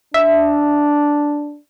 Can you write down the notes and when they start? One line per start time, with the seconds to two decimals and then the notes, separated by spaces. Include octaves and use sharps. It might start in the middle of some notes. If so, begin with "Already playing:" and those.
0.14 D4 E5